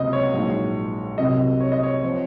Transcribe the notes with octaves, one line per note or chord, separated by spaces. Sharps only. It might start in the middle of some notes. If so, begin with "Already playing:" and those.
Already playing: C#2 C3 F#3 D#5
C#5
A#1 G#2 F#3
C2 C3 F#3 D#5
C#5
D#5
C#5
F3 C4 C#5